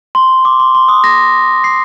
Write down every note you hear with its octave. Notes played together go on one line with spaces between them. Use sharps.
C6
D6
C6
C6
D#6
A#6
C7